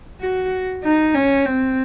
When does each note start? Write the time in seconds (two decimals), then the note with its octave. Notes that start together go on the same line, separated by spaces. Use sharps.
0.21 F#4
0.84 D#4
1.14 C#4
1.46 C4